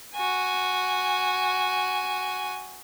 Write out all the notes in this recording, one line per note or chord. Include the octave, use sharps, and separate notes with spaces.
F#4 G#5